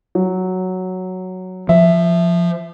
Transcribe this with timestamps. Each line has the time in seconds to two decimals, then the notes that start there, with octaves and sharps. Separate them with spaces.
0.15 F#3
1.69 F3 E5